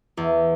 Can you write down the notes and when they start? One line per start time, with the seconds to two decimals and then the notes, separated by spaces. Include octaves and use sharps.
0.17 E2